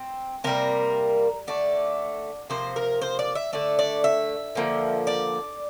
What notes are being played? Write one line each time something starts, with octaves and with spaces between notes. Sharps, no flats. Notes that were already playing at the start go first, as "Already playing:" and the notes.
Already playing: C4
C3 G3 A#3 A#4
D3 A3 D5
C3 F3 A#3 C5
A#4
C5
D5
E5
D3 A3 D5
D5
E5
D3 F3 A#3
D5